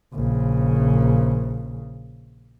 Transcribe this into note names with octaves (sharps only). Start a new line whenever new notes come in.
A#1 C#3